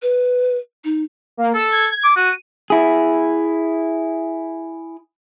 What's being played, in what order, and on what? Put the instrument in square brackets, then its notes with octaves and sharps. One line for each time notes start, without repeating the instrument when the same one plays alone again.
[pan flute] B4
D#4
[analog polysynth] A#3
[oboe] A4 [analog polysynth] E6
[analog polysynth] G#6
[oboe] D6
[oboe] F#4 [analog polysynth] D#7
[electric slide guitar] E4 G#4